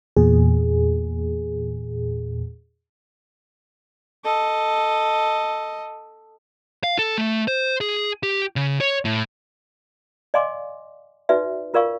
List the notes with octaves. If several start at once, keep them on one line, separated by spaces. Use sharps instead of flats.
E2 A#2 G#4
A4 D#5
F5
A4
A3
C5
G#4
G4
C#3
C#5
A2
D5 D#5 F5 G#5 C6 D6
D#4 F#4 B4 D5 E5
F4 A#4 D5 F5 C#6